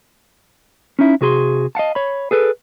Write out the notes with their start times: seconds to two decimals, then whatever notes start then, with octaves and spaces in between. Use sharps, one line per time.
0.99 C#4 D#4 E4
1.21 C3 F#4 G#4 B5 C6
1.75 D#5 F5 F#5 A5
1.95 C#5 B5
2.31 G#4 A4 B4